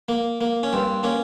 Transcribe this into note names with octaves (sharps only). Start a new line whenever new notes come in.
A#3
A#3
C#4
G2 C4
A#3 C#4